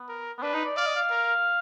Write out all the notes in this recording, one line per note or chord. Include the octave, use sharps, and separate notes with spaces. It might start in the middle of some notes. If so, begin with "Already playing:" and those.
Already playing: B3
A#4
B3
D4 B4
D#4
D5
D5 F5
D#5
F5
A#4